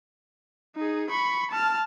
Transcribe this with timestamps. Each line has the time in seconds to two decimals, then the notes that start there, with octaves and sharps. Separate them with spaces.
0.76 D#4 G#4
1.10 B5 C#6
1.51 A5 F6